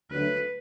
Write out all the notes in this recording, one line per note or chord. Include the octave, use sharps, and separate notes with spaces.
D2 D3 F#3 A3 B4